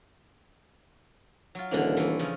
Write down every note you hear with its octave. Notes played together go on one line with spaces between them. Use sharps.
F#3 F4
D#1 D3 E3 A#3
E3 A3
C#3 F3 F4